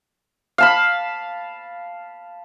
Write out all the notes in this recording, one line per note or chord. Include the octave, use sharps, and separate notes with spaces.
F5 A5 B5